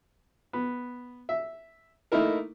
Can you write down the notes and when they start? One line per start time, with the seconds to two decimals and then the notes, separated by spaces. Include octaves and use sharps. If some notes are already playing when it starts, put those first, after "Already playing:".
0.53 B3
1.29 E5
2.12 A3 A#3 D#4 E4 A#4